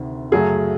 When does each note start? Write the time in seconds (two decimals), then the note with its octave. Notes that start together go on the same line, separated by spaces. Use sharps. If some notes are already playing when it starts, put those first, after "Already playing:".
Already playing: D2 C3 D#3
0.32 F#2 C#3 F#3 A3 G#4